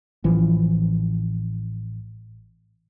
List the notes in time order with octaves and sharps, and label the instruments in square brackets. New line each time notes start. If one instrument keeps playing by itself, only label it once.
[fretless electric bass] A1 E3 F3